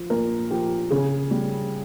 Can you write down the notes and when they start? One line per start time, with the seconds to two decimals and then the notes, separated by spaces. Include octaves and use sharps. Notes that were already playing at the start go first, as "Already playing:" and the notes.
Already playing: F3
0.10 A#2 A#4
0.50 F3 G4
0.91 C#3 G#4
1.31 G3